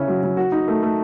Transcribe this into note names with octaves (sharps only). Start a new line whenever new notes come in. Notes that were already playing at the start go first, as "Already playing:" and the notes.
Already playing: C#3 C#4 E4
F#3
F#3
F#4
D#4
A3
A3